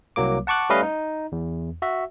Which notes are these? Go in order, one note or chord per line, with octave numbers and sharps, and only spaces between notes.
C2 F#3 A#3 D6
F#5 A5 C#6 D6 F#6
G3 A3 C#4 B4 D#5 F5
D#4
E2
F#4 E5